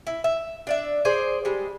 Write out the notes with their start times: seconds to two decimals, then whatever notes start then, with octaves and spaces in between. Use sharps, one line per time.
0.07 E4
0.24 E5
0.67 D4 D5 E5
1.05 G#4 C5 D5
1.45 G3 G#3